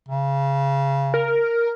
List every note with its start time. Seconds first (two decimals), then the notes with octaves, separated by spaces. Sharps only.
0.09 C#3
1.14 A#4